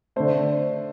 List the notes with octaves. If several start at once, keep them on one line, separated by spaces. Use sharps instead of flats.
D3 A3 C5